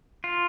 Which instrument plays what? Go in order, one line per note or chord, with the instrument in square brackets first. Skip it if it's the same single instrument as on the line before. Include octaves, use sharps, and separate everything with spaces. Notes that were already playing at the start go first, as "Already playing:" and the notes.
[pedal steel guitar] F4